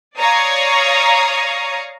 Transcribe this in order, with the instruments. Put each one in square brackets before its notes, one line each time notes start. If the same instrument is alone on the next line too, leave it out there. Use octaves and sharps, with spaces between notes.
[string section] C#5 D5 F5 A#5 C#6 D#6